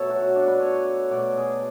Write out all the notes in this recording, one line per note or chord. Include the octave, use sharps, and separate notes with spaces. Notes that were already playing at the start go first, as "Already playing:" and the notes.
Already playing: B2 F#3 A3 A4 C#5 E5
F#4
F#4
D4
B4
C#5
B2 A3 D5
G#4